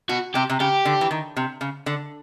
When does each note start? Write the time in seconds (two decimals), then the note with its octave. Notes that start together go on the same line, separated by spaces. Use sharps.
0.09 B2 F#4
0.34 C3 G4
0.50 C3
0.60 C#3 G4
0.85 D3
1.01 E3
1.11 D#3
1.37 C3
1.61 C#3
1.86 D3